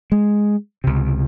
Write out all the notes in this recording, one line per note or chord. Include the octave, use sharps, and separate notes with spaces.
G#3
C#2 C3